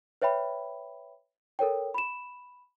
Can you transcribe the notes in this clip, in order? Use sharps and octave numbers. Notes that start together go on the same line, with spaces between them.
B4 C#5 E5 G5 B5
A4 A#4 C#5 G5
B5 E7